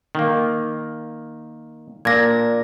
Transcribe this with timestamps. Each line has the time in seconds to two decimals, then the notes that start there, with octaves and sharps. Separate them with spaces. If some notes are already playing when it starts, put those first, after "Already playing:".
0.15 D#3 A#3
2.05 A#2 D4 G#6 A#6